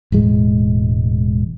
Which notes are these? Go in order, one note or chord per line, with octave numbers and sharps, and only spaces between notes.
E1 A2 G#3